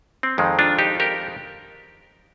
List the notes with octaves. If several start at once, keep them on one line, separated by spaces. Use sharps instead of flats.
C4
F2 D#3 G#3
D4 F4
D#4 G4
G4 A#4